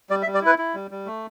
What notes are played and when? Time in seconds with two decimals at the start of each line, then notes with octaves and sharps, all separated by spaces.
0.10 G3 D5
0.22 E5
0.27 G3
0.34 D5
0.42 E4 B4
0.58 E4
0.74 G3
0.91 G3
1.06 A3